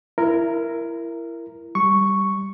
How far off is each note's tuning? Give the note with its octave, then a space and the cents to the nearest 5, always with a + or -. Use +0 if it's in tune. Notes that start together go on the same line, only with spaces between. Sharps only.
E4 +25 A#4 -5
G3 +0 C#6 +0